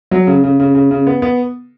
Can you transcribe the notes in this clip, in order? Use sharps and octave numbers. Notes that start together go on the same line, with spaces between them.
F#3
C#3
C#3
C#3
C#3
C#3
B3
B3